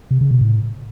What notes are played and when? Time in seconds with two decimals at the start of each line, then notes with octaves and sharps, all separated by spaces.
0.11 C3
0.21 C#3
0.31 B2
0.41 A2